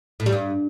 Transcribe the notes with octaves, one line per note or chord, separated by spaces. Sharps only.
A2
G3
G2